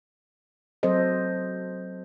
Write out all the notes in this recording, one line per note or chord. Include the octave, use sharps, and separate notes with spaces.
F#3 C4 A4 C5 D#5